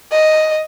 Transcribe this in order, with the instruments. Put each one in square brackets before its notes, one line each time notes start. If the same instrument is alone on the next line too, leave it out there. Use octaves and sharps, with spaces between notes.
[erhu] D#5